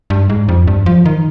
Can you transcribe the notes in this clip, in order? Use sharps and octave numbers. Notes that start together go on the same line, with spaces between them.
G2
G#2
F2
G2
F3
D#3